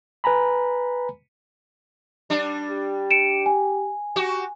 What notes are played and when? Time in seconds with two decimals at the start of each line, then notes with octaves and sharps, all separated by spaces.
0.24 B4 G#5 A#5 B5
2.30 G3 D4
2.71 G4
3.11 C#7 D7 E7
3.46 G#5
4.16 F#4 G4